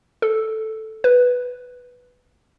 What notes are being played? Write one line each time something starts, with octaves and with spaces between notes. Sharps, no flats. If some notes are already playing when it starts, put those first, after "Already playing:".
A4
B4